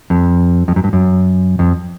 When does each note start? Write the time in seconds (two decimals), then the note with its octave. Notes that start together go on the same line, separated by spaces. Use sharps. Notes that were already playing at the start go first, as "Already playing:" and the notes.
0.10 F2
0.68 F2
0.76 F#2
0.84 G2
0.93 F#2
1.59 F2